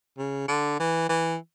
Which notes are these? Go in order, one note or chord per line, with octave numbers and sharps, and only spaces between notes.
C#3
D3
E3
E3